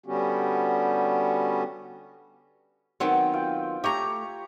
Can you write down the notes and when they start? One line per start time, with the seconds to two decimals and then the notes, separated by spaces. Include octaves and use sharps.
0.06 D3 G3 B3 C#4 F#4 G4
3.00 D#3 F#3 B3 C4
3.33 F4 G5
3.84 A3 G4 C#5 A#5